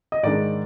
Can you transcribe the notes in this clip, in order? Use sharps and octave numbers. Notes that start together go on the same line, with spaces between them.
D#5
G#2 D#3 G#3 D4 D5